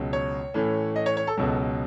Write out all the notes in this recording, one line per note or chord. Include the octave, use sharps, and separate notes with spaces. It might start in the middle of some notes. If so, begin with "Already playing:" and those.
Already playing: C#2 B2 F#3
C#5
A2 E3 A3 C#4
D#5
C#5
C#5
A4
C#2 B2 F#3 A4